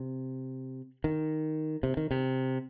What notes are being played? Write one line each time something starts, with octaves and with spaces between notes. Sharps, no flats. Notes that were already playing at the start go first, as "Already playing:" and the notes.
Already playing: C3
D#3
C3
D#3
C3